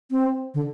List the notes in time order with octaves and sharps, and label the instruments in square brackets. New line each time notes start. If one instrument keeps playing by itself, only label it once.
[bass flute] C4
D3